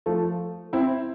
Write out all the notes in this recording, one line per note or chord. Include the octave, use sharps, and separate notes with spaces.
F3 A3
C4 E4